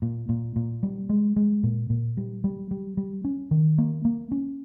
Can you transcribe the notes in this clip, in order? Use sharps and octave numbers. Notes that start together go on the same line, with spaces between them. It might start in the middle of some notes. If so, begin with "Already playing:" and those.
A#2
A#2
A#2
G3
G#3
G#3
A#2
A#2
G3
G3
G3
G3
C#4
D#3
A#3
A#3
C#4